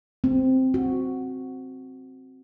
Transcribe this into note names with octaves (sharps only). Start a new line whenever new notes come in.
C4
F#4